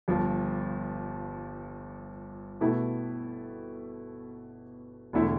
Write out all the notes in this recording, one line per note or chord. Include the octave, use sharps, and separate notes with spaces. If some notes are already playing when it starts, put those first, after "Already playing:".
G1 G2 F3
B2 A3 E4 G4
E1 D3 A3 E4